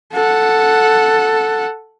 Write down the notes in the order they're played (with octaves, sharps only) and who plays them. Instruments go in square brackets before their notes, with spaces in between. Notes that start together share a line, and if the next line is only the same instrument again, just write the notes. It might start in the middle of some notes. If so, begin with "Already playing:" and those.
[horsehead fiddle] A4 F#5